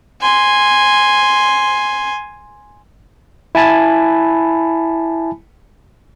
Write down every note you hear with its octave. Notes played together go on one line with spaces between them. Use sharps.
G#5 C6
E4 G#5 A5 B5